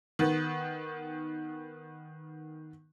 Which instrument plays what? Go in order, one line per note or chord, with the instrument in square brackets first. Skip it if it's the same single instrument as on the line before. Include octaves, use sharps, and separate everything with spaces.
[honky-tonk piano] D#3 B3